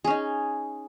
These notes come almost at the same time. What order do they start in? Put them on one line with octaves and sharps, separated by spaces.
G#4 C#4 D#4